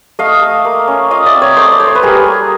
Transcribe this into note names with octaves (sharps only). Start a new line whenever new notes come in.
A3 D#5 F5
A3
A#3
C#4
F4 D#5 F5
D5 E5
C4
C#5 D#5
A3 C5 D5
D5
A3 C#5
C5
B4
G3 G#4 A#4
A#3